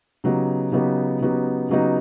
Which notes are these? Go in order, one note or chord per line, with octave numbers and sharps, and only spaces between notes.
C#3 F#3 B3 D#4 G4
C#3 F#3 B3 D#4 G4
C#3 F#3 B3 D#4 G4
C#3 F#3 B3 D#4 G4